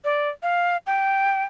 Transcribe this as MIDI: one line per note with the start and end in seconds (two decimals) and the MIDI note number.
0.04 0.29 74
0.43 0.77 77
0.87 1.43 79